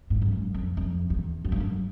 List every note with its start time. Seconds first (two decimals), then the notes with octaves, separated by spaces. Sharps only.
0.10 G#2
0.22 F2
0.32 F#2
0.54 F2
0.77 F2
1.10 E2
1.44 F#2
1.52 G2
1.60 F#2